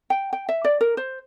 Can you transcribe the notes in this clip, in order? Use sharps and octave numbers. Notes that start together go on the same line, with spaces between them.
G5
G5
E5
D5
A#4
C5